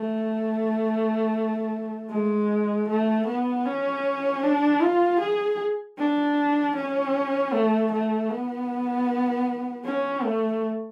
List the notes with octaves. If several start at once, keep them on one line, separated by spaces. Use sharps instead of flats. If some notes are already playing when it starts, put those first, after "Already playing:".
Already playing: A3
G#3
A3
B3
C#4
D4
F4
G#4
D4
C#4
A3
A3
B3
C#4
A3